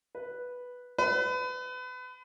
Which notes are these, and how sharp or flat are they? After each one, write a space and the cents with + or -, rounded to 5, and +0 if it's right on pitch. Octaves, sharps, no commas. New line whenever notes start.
B4 -5
B4 +30